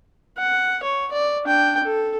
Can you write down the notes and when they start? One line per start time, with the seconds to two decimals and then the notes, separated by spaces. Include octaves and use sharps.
0.38 F#5
0.83 C#5
1.12 D5
1.44 D4 G5
1.84 A4